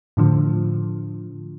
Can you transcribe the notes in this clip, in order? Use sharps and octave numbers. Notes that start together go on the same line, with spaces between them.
A2 D3 F3